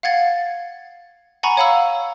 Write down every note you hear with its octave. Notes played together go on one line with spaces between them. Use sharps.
F5 F#5 G#6 A6
F#5 G#5 A#5 B5 C#6
C#5 F5 F#5 A#5 B5 E6